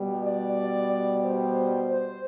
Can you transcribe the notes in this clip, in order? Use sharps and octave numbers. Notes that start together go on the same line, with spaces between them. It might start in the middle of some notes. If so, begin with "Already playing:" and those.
Already playing: B2 G3
D5
C5
C5